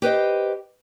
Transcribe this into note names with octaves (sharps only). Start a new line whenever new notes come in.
G4 B4 C5 D#5